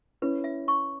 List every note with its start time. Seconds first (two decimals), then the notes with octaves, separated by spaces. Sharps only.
0.22 C#4 E4 B4
0.44 E5
0.68 C#6